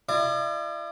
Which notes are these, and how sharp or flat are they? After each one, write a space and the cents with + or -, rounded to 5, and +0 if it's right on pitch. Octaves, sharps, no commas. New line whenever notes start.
E4 +45 D5 +45